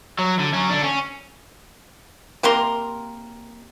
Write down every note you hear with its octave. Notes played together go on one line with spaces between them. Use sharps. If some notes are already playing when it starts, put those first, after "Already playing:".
F#3
D3
F#3 C#4
D3 D4
C#4
C3 A#3 A#4 C6